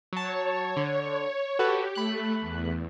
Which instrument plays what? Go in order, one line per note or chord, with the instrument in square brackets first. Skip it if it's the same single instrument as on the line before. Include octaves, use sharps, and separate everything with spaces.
[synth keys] F#3 A5 [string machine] C#5
[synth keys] D3
[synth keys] F#4 A4 B4 [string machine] G4
[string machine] A3 [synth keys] B5 F#6
[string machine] E2